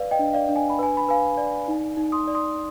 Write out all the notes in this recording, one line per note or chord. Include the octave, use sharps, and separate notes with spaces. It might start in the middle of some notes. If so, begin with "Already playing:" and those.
Already playing: B4 D5 F5
D#5 G5
D4
D5 F5
D4
G#5
B5
B4 G#5
B5
B4 F5 G#5
D5
D#4
D#4
C6 D#6
D5
C6 D#6